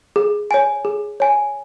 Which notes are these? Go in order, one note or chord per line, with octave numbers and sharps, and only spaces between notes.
G#4
C#5 G#5
G#4
C#5 G#5